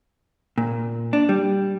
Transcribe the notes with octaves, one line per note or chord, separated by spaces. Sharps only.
A#2
D4
G3